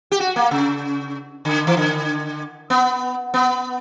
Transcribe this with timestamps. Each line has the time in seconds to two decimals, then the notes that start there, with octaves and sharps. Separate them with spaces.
0.12 G4
0.20 F#4
0.36 A#3
0.51 C#3
1.45 D3
1.67 E3
1.77 D3
2.70 B3
3.34 B3